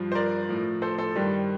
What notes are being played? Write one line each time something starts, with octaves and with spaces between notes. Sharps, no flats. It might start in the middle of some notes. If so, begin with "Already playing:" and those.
Already playing: G2 F3
C5
A#4 D5
A2 F3
A4 C5
A4 C5
G2 D#3 G3